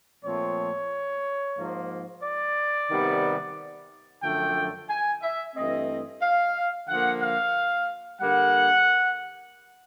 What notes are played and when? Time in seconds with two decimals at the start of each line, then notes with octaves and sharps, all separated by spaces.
0.24 A#2 F3 A3 C4 C#5
1.58 G#2 F3 A#3
2.23 D5
2.90 C3 D#3 G3 B3
4.23 F#2 D3 F3 A3 G5
4.89 G#5
5.22 E5
5.56 G2 E3 A3 C4 D#5
6.22 F5
6.88 D3 F3 A#3 F#5
7.22 F5
8.21 D3 G3 A#3 F#5